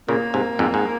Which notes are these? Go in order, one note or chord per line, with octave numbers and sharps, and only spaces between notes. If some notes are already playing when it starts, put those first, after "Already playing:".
A#2 C#3 A#3
G#2 C3
F2 G#2
G#2